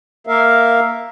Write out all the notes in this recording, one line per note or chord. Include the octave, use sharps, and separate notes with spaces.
A#3 A#4 E5 F5